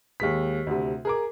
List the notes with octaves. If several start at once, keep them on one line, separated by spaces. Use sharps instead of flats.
D#2 G#3 B6
D2 C3
G#4 A#4 D6